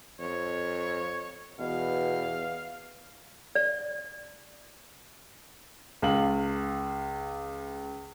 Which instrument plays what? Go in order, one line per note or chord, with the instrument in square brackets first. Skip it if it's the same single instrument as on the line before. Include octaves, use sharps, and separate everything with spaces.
[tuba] F2 [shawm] C#5
[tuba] E2 [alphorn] B2 [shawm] F5
[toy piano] D5
[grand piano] C#2 F5 F#7